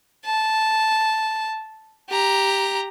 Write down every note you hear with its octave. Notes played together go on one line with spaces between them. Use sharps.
A5
G4 A#5